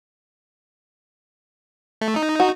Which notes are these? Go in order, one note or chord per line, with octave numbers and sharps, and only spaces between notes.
A3
D#4
F#4